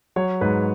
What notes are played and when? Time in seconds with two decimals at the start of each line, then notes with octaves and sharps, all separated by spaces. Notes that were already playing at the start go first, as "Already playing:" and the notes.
0.16 F#3 C#5
0.41 G#2 B4